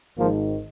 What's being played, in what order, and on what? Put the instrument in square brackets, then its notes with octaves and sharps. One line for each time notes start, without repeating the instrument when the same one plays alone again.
[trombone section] G#1 G#2 D#3 F3 A#3